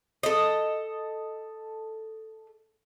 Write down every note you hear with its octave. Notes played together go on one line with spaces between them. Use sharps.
A4 D#5